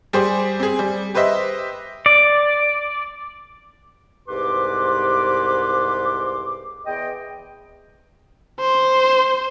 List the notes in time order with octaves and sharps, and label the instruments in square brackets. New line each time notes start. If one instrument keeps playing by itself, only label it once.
[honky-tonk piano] G3 G4 G#4 C5
C4 G#4
G3
G4 B4 C5 D#5 E5
[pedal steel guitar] D5
[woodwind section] C2 G#2 G4 B4 C6 D6
E2 D#5 G5
[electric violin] C5